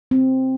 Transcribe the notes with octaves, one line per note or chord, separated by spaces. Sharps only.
C4